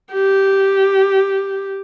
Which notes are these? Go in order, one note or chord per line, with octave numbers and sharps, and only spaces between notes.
G4